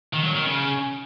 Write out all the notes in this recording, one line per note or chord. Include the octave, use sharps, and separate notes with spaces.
D#3
F#3
D#3
C#3